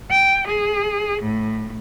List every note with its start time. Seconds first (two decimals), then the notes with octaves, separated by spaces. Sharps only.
0.10 G5
0.46 G#4
1.21 A2